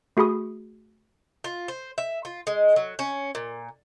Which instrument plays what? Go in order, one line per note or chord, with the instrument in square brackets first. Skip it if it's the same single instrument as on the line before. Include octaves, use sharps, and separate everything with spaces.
[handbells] A3 F#4 G#4 B5 D#6
[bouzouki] F4
C5
E5
F4
G#3
F#3
C#4
A#2